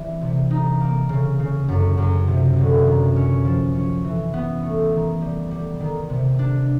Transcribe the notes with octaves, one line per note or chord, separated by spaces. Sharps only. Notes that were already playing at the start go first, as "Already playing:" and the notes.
Already playing: E3 G3 C4
C3
D#4
A#3
C#3
C#3
F#2
F#2
C3
D2
D#3
C#4
F3
C#4
E3
B3
A3
D#3
G3
G3
D#3
C3
D4